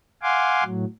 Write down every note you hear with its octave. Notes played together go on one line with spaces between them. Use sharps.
F5 F#5 G#5 C6 D6
A2 F#3